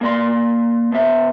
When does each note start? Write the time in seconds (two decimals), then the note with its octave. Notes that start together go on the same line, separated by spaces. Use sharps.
0.01 A#3 D5 C6
0.92 B2 E5